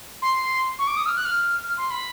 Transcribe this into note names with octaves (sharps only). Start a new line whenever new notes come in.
C6
C#6
D6
D#6
F6
F#6
F6
F6
C6
B5